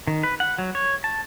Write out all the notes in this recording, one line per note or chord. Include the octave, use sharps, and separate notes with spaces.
D#3
B4
F#5
F#3
C#5
A5